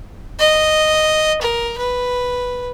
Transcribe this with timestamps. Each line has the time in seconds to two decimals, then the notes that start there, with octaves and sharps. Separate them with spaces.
0.39 D#5
1.42 A#4
1.78 B4